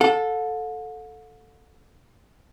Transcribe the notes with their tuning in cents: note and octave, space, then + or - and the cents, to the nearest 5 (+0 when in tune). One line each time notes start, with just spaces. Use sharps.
A4 +0 F#5 -45